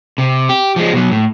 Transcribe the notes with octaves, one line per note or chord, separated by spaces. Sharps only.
C3
G4
F3 G#3
B2 F#3
A2